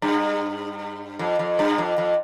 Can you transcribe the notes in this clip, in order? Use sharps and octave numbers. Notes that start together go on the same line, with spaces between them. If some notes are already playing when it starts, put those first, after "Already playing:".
G2
F2
F2
G2
F2
F2